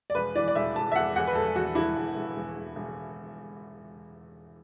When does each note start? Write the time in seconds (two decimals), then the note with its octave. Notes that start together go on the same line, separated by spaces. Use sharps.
0.10 D5
0.15 E1 B4
0.36 E3 D5
0.48 D5
0.55 E1 E5
0.76 E1 A5
0.92 E5
0.95 E2 F#5
1.16 E2 F#5
1.27 B4
1.35 E1 A4
1.56 E2 F#4
1.75 E1 E4
1.96 E1
2.16 E1
2.36 E1
2.56 E1
2.76 E1